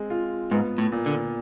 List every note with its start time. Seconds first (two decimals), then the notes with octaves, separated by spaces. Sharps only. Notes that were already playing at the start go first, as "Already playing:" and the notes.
Already playing: G#3 C4
0.10 F4
0.51 G#2 B3
0.78 A2
0.92 A#2
1.06 D3